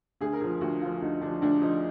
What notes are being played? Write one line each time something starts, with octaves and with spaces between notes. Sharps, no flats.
D2 G#4
A#4
D3 F3 G#4
D2 F#4
D3 F3 F4
D2 D#4
D3 F3 D4
D2 D4
D3 F3 D#4